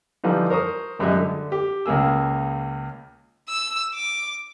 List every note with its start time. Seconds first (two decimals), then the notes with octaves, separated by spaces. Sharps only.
0.24 D3 E3 F3 G3 D#4
0.50 A#4 C5 C#6 D#6
0.99 G#1 F#2 G3 G#3 D#5 E5
1.17 D3
1.52 G4
1.86 C#2 C#3 A#3 G#4 E6
3.49 E6
3.95 D6